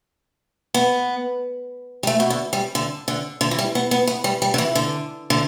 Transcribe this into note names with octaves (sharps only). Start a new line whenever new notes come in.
B3
G3
A3
B2
D3
G3
D3
D3
D3
E3
G3
B3
B3
B3
G3
G3
D3
E3
D3
D3